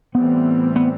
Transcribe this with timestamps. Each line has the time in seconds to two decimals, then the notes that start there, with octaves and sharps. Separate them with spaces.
0.15 A2 E3 G3 B3 C4
0.76 B3